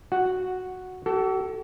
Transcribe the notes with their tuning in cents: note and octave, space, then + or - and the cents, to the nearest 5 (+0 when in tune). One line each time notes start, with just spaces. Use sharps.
F#4 -5 F#5 +0
F#4 +45 A4 +0